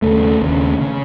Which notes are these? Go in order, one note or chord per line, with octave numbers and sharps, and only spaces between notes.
D#2 C#3 A3
D#2 C#3
C#3